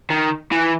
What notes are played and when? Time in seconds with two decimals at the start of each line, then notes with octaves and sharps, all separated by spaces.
0.10 D#3
0.52 E3